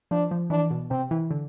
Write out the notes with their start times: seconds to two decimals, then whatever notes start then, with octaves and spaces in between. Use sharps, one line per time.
0.11 F3 D4
0.31 F3
0.50 E3 D4
0.71 B2
0.90 C3 C4
1.11 E3
1.31 D3